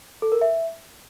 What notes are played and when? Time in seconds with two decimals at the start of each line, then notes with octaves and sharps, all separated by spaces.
0.22 A4
0.32 A#4
0.41 E5